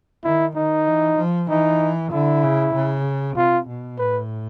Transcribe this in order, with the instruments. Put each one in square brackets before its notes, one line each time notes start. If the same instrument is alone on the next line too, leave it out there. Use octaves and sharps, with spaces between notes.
[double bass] D#3 [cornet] E4
[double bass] D#3 [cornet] D#4
[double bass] E3
F3
[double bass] E3 [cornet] D#4
[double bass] D3 [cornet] E4
[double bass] C#3
C#3
[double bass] C3 [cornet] F4
[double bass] B2
[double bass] A2 [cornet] B4